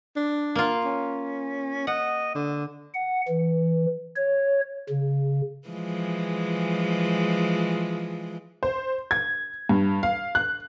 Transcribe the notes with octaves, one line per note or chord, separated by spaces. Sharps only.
D4
A#3 F4
C#4
D#5 F#5
D3
F#5
E3
C#5
C#3
E3 F3 G#3
C5
G#6
G2
F5
F#6